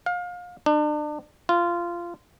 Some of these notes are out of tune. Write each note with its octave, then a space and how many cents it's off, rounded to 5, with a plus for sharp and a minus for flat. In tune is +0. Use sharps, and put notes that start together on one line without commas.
F5 +30
D4 +35
F4 -15